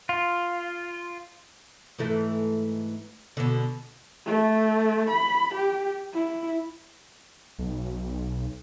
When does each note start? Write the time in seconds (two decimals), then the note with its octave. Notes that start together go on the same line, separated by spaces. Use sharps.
0.09 F4
1.98 G#2 E3 A3
3.37 B2 D3
4.26 A3
5.11 B5
5.55 G4
6.14 E4
7.59 B1